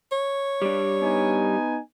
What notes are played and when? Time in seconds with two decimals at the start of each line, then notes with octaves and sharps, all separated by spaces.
0.12 C#5
0.62 G3 D4
1.02 B3 D#4 G#5